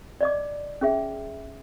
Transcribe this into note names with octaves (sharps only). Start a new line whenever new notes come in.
D5 D#5 D6
C#4 G#4 E5